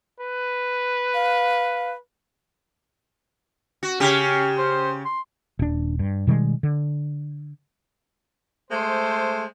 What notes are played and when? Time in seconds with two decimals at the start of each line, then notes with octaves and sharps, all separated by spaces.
0.21 B4
1.14 F5
3.83 F#4
4.00 C#3 C#4 G4
4.58 C5
5.05 C6
5.59 D#1 D4
5.99 G2
6.27 B2 D#3 G3 G#3
6.63 D3
8.71 G#3 A3 C5